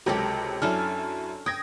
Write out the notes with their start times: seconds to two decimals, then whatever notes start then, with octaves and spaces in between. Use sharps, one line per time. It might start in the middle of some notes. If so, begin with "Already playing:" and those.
0.06 C#2 C3 F#3 G4 A4 A#4
0.62 F#2 C#4 D4 E4 A4 F6
1.46 G5 D#6 G#6 A#6